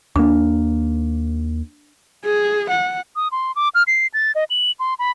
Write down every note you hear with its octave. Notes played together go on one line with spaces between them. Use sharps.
D#2 A#3 D4
G#4
F#5
D#6
C6
D6
F6
C7
A6
D#5
F#7
C6
B5